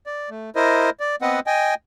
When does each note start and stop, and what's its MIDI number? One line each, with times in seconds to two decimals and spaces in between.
0.06 0.30 74
0.30 0.50 57
0.56 0.90 64
0.56 0.90 70
0.56 0.90 72
0.56 0.90 75
1.00 1.16 74
1.22 1.40 59
1.22 1.40 60
1.22 1.40 71
1.22 1.40 75
1.22 1.40 78
1.47 1.74 75
1.47 1.74 79
1.47 1.74 80